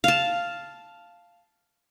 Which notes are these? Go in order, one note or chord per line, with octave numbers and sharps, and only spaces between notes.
F5 A5